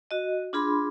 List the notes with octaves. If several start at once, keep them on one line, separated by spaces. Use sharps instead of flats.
F#4 D#5
D4 F4 G#4 B5 C6